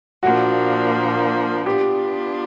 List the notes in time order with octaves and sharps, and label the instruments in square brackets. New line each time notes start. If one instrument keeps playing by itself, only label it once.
[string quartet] A#2 F3 A#3 D4 [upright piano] F#4
[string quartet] B3 D4 F4 [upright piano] G4